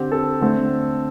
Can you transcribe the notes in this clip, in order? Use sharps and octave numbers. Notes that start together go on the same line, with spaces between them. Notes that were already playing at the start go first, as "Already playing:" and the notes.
Already playing: D3 C4 G4
A4
D3 A3 C4